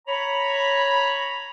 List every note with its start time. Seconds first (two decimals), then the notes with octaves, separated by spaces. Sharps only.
0.07 C#5 A#5 B5